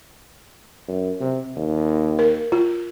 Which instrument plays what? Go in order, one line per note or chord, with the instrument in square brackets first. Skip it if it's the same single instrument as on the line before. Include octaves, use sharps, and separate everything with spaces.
[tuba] F#2
C3
D#2
[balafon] A#4
F4